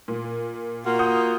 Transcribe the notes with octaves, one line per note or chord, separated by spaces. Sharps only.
A#2
A#3 F4 F#4
F#5 D#6 G6